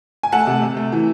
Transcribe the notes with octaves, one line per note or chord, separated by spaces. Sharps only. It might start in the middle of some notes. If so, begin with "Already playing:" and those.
G#5
A3 F#5 A5
C3
C3
A3
E3